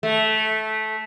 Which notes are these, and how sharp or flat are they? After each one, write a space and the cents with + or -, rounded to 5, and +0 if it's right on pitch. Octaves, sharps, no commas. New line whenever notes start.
A3 -15